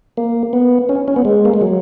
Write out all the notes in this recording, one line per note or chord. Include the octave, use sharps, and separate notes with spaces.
A#3
B3
C#4
C#4
B3
G#3
A#3
G#3
F#3